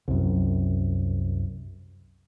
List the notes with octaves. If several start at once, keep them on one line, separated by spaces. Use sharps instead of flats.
C2 F#2